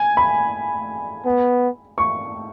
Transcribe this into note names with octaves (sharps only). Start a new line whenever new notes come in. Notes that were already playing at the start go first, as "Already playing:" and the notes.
Already playing: G#5
B5
B3
C#6